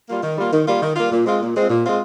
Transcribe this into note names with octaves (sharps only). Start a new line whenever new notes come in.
G3 A#3 F4
D#3
G3 A#3 F4
D#3
G3 A#3 F4
D#3
G3 A#3 F4
A#2
G#3 C4 F4
A#2
G#3 C4 F4
A#2
G#3 C4 F4